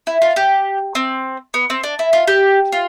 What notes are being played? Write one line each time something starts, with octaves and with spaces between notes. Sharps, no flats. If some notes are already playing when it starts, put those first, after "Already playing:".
E4
F4
G4
C4
B3
C4
D4
E4
F4
G4
F4